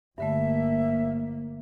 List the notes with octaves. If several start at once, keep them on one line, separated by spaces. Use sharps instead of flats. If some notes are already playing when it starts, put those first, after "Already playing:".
G1 G2 D3 A3 A#3 E5